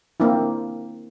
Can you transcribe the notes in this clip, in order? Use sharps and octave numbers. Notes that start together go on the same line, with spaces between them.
A#3 C4 D4 E4